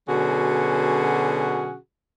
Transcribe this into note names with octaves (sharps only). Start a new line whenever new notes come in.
B2 D3 F#3 C#4 F#4 G#4